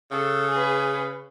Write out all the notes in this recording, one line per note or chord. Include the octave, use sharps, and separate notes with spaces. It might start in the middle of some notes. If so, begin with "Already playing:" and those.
C#3 A4
G#4 B4